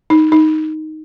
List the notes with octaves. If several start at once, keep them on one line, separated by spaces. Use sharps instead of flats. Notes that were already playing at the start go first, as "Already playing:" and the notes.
D#4
D#4